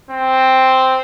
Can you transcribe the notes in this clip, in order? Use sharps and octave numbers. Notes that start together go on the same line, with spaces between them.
C4